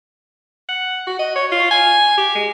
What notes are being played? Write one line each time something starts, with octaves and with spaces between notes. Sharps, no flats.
F#5
F#4
D#5
C#5
F4
G#5
G4
G#3